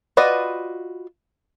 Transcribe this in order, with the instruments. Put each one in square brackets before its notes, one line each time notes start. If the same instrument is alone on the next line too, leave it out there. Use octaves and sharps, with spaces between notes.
[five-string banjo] F4 F#4 B4 D5 D#5